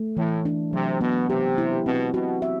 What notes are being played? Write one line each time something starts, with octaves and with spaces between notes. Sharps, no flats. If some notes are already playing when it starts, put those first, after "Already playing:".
Already playing: A3
A2 E3
D4
C3 F#3
B2 B3
C3 G4
E4
B2 C4
B2 F#4
E5